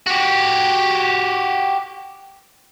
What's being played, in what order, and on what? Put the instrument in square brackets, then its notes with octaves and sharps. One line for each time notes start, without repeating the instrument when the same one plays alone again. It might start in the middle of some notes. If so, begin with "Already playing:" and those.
[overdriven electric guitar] F#4 G4